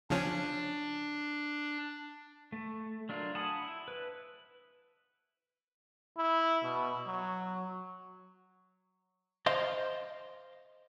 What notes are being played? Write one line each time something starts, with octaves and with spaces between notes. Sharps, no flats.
C#3 F3 C#4 D4
A3
F#3 D4 F4 A#4
F#5 G#5 A5 B5 D#6
E4
B4
E4
B2
F#3
C5 D#5 F5 C6